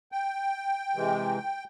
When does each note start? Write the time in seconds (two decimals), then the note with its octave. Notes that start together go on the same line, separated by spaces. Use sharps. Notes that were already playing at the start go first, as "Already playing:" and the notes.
0.12 G5
0.95 C3 E3 G#3